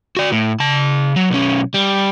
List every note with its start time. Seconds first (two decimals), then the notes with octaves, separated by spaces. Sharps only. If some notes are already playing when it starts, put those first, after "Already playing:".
0.17 F#4 D5
0.32 A2
0.60 C#3 A5
1.16 F#3
1.30 B1 C#4
1.74 G3